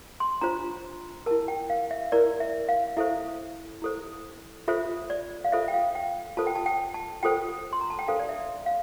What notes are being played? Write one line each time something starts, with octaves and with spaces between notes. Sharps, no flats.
C6
D4 F4 C5 A#5
E4 A#4 A5
G5
F5
E5
E4 A#4 D5
E5
F5
E4 A4 C5 E5
E4 A4 C5
F4 A4 C5 E5
D5
F5
F4 A4 C5 E5
G5
F5
G5
F4 A4 C5 A5
G5
A5
G5
A5
F4 A4 C5 G5
C6
A#5
A5
G5
D4 A4 C5 F5
D5
E5
F5